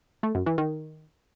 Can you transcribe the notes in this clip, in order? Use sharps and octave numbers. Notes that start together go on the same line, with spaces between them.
A3
F#2
E3
D#3